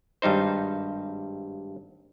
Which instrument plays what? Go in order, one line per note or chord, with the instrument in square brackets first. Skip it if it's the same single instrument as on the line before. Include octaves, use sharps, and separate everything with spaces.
[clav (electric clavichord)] G#1 G2 G3 D#4 C5